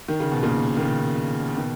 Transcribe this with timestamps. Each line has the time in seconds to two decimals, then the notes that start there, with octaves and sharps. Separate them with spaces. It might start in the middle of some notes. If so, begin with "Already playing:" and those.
0.08 D#3
0.20 C#3
0.32 B2
0.43 A#2 C#3
0.77 D#3
0.82 A#2 C#3
1.56 B2 D#3